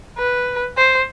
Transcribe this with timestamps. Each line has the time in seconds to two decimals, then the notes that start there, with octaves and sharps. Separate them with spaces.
0.18 B4
0.77 C5